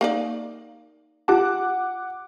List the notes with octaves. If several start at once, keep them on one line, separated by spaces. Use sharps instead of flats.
A#3 D#4 D5
F4 G4 F#5 A5 D6 F#6